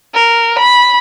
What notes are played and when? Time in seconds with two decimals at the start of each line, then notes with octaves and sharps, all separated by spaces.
0.14 A#4
0.58 B5